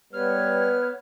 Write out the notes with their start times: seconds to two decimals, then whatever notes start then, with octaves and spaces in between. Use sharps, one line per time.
0.13 G3 B3 B4 C#5 F6